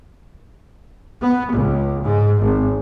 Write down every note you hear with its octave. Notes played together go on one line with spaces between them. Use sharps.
B3
C#2
G#2
G#1